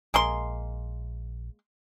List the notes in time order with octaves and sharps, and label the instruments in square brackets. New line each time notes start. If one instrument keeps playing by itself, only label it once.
[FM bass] A#1 [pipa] G#3 A#3 C6